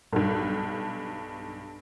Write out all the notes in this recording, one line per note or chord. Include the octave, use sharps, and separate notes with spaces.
B1 G2